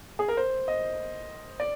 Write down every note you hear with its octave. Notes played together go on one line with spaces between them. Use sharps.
G#4
A#4
C5
D#5
D5